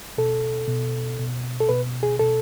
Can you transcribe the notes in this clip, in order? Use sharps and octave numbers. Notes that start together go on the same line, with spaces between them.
B2 A4
B2
B2
A4
B2 B4
G#4
B2 A4